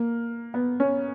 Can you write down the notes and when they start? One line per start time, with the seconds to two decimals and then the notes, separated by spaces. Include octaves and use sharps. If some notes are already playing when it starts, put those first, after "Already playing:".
Already playing: A#3
0.54 B3
0.80 C#4